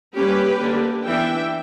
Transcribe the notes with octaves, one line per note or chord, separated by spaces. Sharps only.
G3 A#3 C#4 G4 B4
D3 A#3 D4
E3 B3 D4 E5 G5